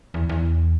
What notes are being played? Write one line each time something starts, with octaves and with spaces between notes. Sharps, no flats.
E2
E2